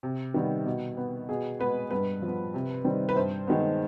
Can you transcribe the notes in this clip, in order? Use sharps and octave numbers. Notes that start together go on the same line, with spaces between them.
C3
D#3 G3 B3
B2
B3
B2 G#4
G#3 B3 B4
G2 B4
F3
B3
C3
D#3 G3 C4
B4
G2 C5
D#3 G#3 B3